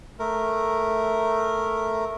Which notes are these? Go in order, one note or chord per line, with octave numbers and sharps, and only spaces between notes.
A3 A#4